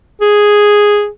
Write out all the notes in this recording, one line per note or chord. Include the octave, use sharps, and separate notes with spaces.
G#4